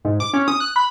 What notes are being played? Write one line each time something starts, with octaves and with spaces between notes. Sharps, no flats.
G#2
D6
C#4
D#6
F#6
B5